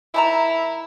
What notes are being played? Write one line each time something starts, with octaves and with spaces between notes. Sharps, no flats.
D#3 E4 A5 A#5